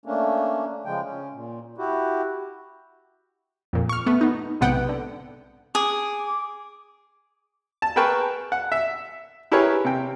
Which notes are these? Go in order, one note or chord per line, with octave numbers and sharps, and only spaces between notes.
A3 A#3 C#4 D4
C#3 F3 G#3 G5
C#4
A#2
E4 F#4 G4
F2 A#2
C#6 F6
A3 B3
B3 D#4
B1 G#2 C3 B3 F#5 G5
D3
G#4 D6
A5
G#4 A#4 B4 G5 A5 C#6
F#5
E5
E4 G4 G#4 A#4 B4 C#5
C3 G5